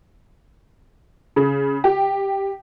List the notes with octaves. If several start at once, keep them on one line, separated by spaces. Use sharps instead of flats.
C#3
G4